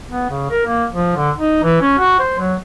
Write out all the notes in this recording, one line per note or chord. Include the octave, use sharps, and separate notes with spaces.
B3
C#3
A#4
A#3
F3
D3
D#4
E3
C#4
F#4
C5
F#3